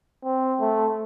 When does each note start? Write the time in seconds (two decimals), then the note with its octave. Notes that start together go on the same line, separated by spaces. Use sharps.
0.25 C4
0.60 A3